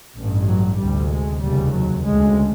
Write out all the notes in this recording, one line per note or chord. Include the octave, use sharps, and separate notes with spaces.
A1 G2
F#3
D2 C3 G3
G#3
F1 D#2 C#3 G3
F#3
D2 C#3 G#3